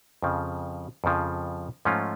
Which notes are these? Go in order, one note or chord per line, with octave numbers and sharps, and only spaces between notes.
F2 C#3 F3
F2 C#3 F3
G#2 F3 A3 C#4 F4